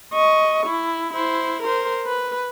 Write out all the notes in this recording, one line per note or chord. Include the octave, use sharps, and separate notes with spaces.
D#5 C#6
E4
E4 C5
A#4 C5
B4